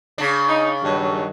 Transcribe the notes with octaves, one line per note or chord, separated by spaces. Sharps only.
C#3 D4
D#4
G2 D#3 F#3